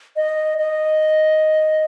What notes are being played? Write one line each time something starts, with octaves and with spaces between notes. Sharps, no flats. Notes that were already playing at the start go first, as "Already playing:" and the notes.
D#5
D#5